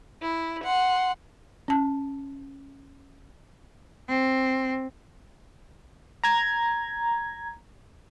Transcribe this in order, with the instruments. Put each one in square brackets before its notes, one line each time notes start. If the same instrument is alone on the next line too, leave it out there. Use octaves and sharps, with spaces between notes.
[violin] E4
F#5 C6
[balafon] C#4 A5
[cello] C4
[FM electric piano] A#5 G#6